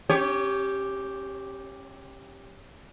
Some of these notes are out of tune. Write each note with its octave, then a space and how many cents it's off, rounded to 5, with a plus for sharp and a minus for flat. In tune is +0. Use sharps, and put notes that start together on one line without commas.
C#4 -30 G4 +0 C#5 +20